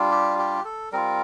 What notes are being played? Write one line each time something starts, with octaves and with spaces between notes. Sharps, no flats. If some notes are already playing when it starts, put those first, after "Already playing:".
Already playing: G3 D4 F4
G4
G4
A4
G3 C4 F4 A#4